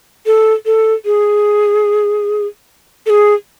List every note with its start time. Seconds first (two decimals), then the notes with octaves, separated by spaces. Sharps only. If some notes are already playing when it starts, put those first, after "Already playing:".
0.26 A4
0.66 A4
1.05 G#4
3.06 A4
3.10 G#4